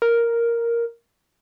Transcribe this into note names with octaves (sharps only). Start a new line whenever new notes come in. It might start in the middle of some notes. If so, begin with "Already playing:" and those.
A#4